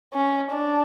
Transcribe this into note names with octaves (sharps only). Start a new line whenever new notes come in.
C#4
D4